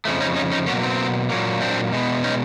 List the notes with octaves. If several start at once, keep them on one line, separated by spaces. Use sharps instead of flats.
F2 C#3 F3 A3
C#4 D#4
C#4 D#4
C#4 D#4
B2 F#3 A#3 B3 C#4
C4
A#2 F#3 A#3
C4 D4
B2 G#3 B3
C#4 D#4